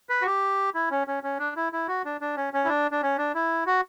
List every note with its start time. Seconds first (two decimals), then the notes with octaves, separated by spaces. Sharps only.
0.09 B4
0.22 F#4
0.26 G4
0.75 E4
0.91 C#4
1.07 C#4
1.23 C#4
1.39 D4
1.56 E4
1.73 E4
1.88 F#4
2.05 D4
2.21 D4
2.37 C#4
2.53 C#4
2.64 E4
2.69 D4
2.91 D4
3.02 C#4
3.18 D4
3.35 E4
3.66 F#4